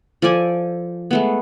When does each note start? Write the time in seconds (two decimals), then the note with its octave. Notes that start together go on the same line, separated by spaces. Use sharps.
0.22 F3 A4 D5 G#5
1.11 G#3 A3 B3